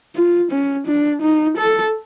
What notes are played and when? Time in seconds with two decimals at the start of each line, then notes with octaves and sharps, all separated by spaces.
0.16 F4
0.51 C#4
0.87 D4
1.22 D#4
1.57 A4